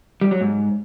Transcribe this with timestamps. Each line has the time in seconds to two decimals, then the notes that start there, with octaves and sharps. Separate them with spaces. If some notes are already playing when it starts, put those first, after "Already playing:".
0.21 G3
0.31 F#3
0.41 G#2